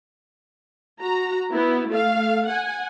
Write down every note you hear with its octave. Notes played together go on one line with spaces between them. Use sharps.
F#4 A#5
B3 E4
A3 F5
F#5 G#5